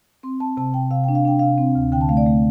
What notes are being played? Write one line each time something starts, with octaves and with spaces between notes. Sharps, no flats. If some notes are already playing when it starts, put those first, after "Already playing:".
C4 C6
C4 A5
C3 A5
C3 G5
C3 F5
D4 G5
F5
D4 G5
C3 F5
C4
D2
D3 G5
A5
A3 F5
D5
A3